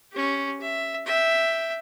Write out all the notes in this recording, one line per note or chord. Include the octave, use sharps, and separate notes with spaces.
C#4 G4
E5
E5 G5